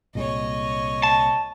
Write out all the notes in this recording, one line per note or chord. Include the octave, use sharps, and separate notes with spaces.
C2 A#2 G#3 C#5 D#5
A5